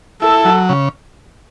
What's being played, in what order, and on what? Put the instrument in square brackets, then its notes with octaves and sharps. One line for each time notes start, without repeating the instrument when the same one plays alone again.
[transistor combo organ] E4 [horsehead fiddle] A4
[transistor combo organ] F#3
C#3